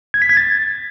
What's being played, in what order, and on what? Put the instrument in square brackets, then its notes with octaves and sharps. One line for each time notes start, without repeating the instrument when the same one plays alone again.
[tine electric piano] G#6
B6
G#6
A6